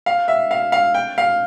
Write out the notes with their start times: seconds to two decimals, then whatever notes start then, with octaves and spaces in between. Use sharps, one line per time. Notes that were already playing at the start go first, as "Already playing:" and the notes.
0.06 F5
0.28 E5
0.51 F5
0.72 F5
0.94 G5
1.18 F5